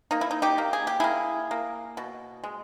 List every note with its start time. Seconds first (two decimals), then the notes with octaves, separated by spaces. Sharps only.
0.11 A#3 D#4
0.21 E4
0.31 D#4
0.42 D#4 G4
0.58 A#3
0.73 G#4
0.87 G4
1.00 A#3 E4 G#4
1.51 A#3
1.97 B2
2.44 G#3